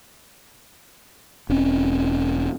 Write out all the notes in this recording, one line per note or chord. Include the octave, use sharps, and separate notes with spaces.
E1 C4 C#4